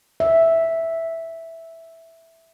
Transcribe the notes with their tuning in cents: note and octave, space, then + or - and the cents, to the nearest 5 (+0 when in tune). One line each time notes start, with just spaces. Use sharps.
E5 -5